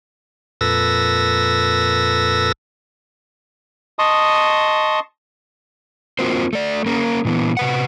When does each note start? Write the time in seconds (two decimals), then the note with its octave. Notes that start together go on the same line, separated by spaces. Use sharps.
0.61 F2 A#2 A4 B4 E6 A#6
3.99 D#5 A5 C6 C#6 D#6
6.19 A#3 C4 F4 F#4 A#4 C5
6.53 A3 D5
6.86 A#3 C#4 A#4
7.25 A#2 D3 E3 B3
7.57 C3 B4 F#5